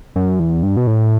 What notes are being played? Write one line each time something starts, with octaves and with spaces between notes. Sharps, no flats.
F#2
E2
G2
B2
A2